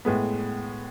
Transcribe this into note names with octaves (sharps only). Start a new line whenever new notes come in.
A2 G#3 B3